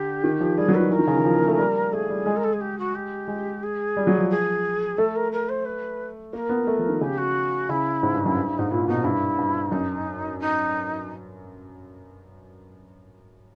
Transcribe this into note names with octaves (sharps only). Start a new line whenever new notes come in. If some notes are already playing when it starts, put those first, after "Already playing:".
Already playing: D3 G4
D#3
F3
G3 G#4
F#3
B4
D#3
E3 A#4
D#3
C#3
E3
F3
A#3
A3
G3
A3 G#4
G3
G#3
A#4
A4
G#4
G4
F#4
G4
G#3
G#4
G3
F#3
F3
G#4
A3 A4
A#4
A#4
C5
B4
A#3 A#4
B3
A3
F3
D#3
C#3 G4
F#4
C#3 E4
G#2
G2
F#2
G2
G2
G#2 D#4
A#2 E4
B2 D#4
G2 E4
G2
F#2 D#4
D#4